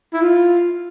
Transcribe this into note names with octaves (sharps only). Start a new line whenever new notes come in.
E4
F4